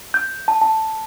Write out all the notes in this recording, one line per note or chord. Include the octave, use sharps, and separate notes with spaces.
G6
A5
A5